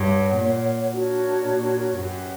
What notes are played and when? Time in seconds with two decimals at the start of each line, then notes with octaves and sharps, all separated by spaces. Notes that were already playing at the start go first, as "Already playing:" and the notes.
Already playing: G2 A#4 C#5 F#5
0.36 A#2
0.90 D4 F#4 A#4 C#5
1.43 A#2
1.96 F#2 G4 B4 F#5